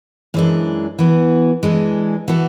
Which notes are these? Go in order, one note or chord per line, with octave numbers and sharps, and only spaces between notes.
F#2 E3 G#3 D4
E3 B3 F#4
E3 G#3 D4 A4
E3 B3 F#4 A4